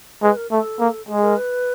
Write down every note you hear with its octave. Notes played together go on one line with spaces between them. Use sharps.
G#3 B4
A#4
A3 A4
A#3
G#3 G#4
A#4
B4